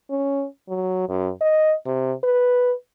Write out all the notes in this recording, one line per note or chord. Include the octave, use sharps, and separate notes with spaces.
C#4
F#3
F#2
D#5
C3
B4